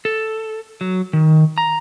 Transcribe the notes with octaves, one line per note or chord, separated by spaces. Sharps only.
A4
F#3
D#3
A#5